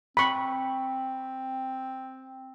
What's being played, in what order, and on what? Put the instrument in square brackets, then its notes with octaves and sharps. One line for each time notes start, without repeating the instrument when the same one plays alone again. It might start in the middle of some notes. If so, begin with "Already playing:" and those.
[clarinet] C4 [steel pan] B5 C#6